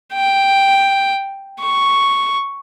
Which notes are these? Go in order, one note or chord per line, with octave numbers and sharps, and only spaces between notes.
G5
C#6